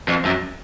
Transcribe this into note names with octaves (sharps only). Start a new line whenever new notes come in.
F2
F#2